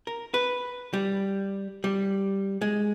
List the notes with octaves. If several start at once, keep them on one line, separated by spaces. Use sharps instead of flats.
A#4
B4
G3
G3
G#3